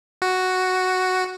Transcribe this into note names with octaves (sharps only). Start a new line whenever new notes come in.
F#4